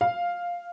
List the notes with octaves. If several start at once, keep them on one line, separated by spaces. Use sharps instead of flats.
F5